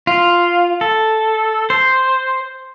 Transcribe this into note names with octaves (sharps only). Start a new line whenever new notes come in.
F4
A4
C5